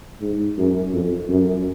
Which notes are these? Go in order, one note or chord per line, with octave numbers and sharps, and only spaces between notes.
G#2
F#2
F2
F#2